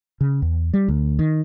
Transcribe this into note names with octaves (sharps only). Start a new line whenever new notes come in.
C#3
E2
G3
D2
D#3